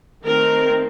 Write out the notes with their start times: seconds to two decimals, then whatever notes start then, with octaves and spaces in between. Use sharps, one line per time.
0.25 D#3 A3 C4 A#4